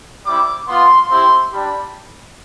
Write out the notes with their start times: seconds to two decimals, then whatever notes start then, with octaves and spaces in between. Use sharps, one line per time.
0.26 G3 C4 E4 D6
0.68 B3 F4 C6
1.10 C4 E4 G4 C6
1.52 G3 D4 G4 B5